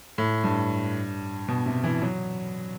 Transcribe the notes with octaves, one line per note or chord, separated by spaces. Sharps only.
A2
G2
B2
C3
E3
F#3